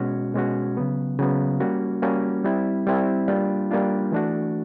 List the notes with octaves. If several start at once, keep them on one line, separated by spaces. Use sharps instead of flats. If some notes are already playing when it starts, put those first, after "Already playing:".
Already playing: B2 G#3 C#4 F#4
B2 G#3 C#4 F#4
C#3 F#3 B3
C#3 F#3 B3
G3 A#3 C#4 F#4
G3 A#3 C#4 F#4
G3 C4 E4
G3 C4 E4
G3 A#3 D4 F4
G3 A#3 D4 F4
E3 A3 D4 F#4